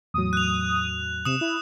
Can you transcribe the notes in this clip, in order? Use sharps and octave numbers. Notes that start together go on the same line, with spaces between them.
E2 A2 F#3 D#6
F#6 F7
C3 D#6 E7
E4